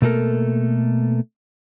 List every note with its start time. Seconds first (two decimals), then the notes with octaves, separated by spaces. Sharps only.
0.02 B2 A3 A#3 A4 A#4